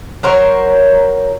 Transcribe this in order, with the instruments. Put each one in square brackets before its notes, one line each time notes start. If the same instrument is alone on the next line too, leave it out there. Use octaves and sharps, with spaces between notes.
[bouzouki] F#3 A#4 C5 C#5